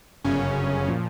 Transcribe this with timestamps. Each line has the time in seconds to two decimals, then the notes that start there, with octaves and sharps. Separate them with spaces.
0.25 G1 F#2 C#3 C#4
0.89 A#2 F3